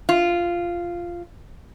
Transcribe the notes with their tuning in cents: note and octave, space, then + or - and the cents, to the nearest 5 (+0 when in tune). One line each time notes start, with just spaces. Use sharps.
F4 -10